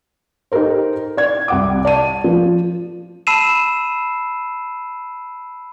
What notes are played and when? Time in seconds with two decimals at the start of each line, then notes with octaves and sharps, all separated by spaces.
0.52 D#4 G4 A4 A#4 C5
1.17 D5 G#6
1.48 C2 F#5 D6
1.85 D5 A5 D#7
2.24 F3
3.27 A5 B5 E6 C7 D#7 E7